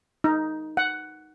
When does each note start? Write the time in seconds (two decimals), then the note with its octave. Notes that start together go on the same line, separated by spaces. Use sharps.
0.24 D#4
0.77 F#5